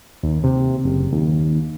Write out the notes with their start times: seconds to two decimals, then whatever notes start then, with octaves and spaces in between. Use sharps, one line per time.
0.23 D#2
0.44 C3
0.84 F#1
1.12 D#2